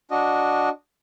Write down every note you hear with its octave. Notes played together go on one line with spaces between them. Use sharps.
D4 F#4 D#5